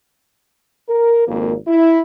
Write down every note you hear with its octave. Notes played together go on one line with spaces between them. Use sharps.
A#4
G#1 F2 A#3
E4